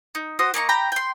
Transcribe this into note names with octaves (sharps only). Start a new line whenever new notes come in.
D#4
F#4 C5 D#6
A#3 D#4 A#5 C#6
G4 G5 A#5 B5
G5 C6